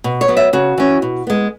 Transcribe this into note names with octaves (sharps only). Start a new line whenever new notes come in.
B2
C#5
F#3 B3
E5
C#3 F#4
E3 C#4
B2
G#3 B3